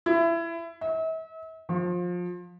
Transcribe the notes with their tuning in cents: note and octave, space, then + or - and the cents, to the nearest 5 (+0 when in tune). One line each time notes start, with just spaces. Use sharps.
E4 +25
E5 -40
F3 +25